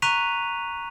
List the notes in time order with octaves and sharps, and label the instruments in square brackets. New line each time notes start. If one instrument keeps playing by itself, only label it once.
[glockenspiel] A#5 C#6 F#6 B6 D#7 F7